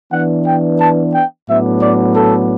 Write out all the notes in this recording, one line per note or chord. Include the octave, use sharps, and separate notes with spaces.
E3 B3 D4 F#5
G5
A5
G5
A2 F#3 B3 D4 E5
D5
A4